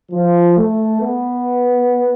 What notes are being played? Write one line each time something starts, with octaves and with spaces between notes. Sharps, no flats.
F3
A3
B3